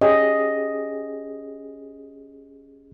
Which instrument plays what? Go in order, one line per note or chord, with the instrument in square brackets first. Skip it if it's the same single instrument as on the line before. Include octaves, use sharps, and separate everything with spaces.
[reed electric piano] C#4 G4 G#4 [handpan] D#5